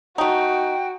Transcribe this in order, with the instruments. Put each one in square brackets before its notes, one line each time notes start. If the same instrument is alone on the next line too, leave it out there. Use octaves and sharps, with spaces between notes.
[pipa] A3 D#4 [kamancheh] F#4 [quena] G5